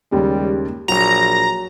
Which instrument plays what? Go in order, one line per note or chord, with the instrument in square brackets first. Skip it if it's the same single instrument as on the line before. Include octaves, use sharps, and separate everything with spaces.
[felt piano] D#2 C#3 G#3 [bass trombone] G3
[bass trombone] A#1 [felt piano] F#3 [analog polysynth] A#5